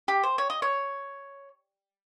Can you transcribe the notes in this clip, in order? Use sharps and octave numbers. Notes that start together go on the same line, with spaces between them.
G4
C5
C#5
D#5
C#5